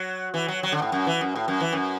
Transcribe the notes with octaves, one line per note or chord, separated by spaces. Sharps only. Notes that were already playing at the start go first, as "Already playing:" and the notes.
Already playing: F#3
E3
F#3
F#3
D3
A2
F#2
E3
F#2
A2
F#2
E3
F#2